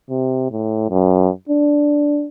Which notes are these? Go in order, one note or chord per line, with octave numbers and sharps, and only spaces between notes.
C3
A2
F#2
D4